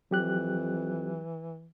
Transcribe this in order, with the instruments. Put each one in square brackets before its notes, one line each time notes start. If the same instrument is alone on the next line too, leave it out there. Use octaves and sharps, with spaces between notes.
[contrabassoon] F2 [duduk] E3 [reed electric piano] F#3 G4 F#6